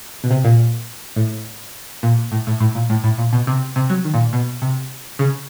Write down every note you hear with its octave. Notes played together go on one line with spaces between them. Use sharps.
B2
C3
A#2
A2
A#2
A2
A2
A2
A#2
A2
A2
A#2
B2
C3
C3
F#3
D#3
A#2
B2
C3
C#3